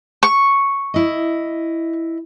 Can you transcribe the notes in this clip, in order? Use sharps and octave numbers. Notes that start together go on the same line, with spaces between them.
C#6
E4 D#5